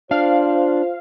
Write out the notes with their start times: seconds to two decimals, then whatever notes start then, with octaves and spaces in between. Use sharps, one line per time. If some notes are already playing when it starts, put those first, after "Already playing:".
0.11 D4 F4 C5 F5